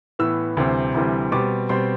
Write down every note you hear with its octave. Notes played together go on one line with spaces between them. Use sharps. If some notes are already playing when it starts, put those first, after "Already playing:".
A2 E3 B3 E6
D2 C3 E3 G3 C4
D2 C3 E3 G3 C4
B2 G3 C4 D6
B2 G3 C4 C6